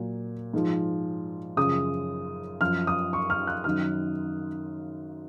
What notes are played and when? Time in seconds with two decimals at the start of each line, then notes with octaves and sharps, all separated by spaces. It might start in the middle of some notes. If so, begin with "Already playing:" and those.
Already playing: A#2 F#3
0.54 G#2 F3
1.57 F#2 C#3 F3 D#6
2.61 F#2 F3 F6
2.87 D#6
3.13 C#6
3.30 F6
3.47 F#6
3.64 F#2 D#3 F#3 F6